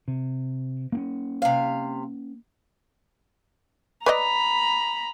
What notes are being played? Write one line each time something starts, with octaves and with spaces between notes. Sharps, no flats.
C3
A#3 C4 C#4
C3 F5
B4 D5 D#5 A#5 B5